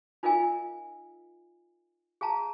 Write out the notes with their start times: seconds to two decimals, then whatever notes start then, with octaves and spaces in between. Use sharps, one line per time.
0.23 D#4 F4 A#4 D#5 F5 G#5
2.21 G#4 F5 A5 A#5